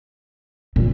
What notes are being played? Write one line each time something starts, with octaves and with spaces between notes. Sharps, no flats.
A#2